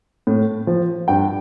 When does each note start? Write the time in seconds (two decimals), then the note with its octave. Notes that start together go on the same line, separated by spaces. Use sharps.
0.27 A2
0.67 F3
1.08 G2 G5